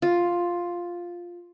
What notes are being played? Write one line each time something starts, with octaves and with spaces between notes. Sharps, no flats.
F4